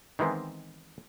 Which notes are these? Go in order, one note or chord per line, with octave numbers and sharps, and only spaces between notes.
D#3 E3 G#3 B3 C4